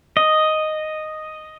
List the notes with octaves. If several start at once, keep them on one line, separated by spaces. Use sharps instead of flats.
D#5